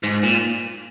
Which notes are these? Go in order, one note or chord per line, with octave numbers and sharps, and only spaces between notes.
G#2
A#2